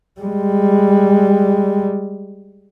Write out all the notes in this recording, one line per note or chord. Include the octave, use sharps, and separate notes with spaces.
G3 G#3